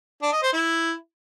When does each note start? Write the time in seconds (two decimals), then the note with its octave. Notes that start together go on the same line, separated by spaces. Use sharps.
0.22 D4
0.32 D#5
0.43 C5
0.53 E4